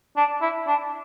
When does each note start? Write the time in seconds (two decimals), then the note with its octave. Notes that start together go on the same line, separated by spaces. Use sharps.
0.17 D4
0.41 E4
0.67 D4